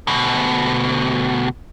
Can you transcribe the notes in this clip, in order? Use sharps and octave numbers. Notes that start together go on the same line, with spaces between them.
D2 B2